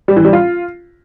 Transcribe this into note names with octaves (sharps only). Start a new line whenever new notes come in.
G3
E3
G3
F4